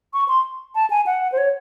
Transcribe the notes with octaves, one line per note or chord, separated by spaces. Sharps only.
C#6
C6
A5
G#5
F#5
C5
C#5